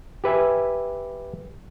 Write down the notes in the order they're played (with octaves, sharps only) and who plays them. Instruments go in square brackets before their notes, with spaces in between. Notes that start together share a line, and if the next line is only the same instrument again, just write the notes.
[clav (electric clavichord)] G4 B4 E5 G#5